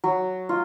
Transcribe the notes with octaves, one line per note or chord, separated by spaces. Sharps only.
F#3
F4